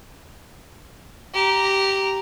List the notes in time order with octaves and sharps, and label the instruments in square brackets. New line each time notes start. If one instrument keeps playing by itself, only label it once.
[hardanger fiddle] G4 A#5